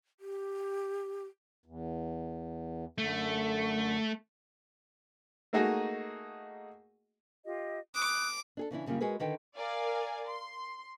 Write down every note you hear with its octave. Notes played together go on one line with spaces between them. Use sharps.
G4
E2
F#2 D3 A3
A3 A#3 D#4 F#4 G#4 D#5
F4 G4 D#5
B5 D6 D#6 F#6
D4 G#4 A4
C#3 E3 D4 E4
F#2 C#3 G3 A#3 F4
G#3 F#4 G#4 A#4 B4
D3 D#3 B4 G5
A#4 D5 F5 G#5
C6